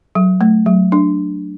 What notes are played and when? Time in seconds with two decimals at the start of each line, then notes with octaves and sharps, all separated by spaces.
0.15 F#3
0.41 A3
0.66 F#3
0.92 D4